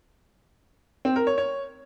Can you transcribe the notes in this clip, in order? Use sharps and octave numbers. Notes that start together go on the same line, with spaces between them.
C4
A#4
C#5
C#5